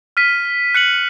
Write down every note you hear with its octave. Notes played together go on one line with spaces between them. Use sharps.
F6 B6 D#7
F#6 C#7 F#7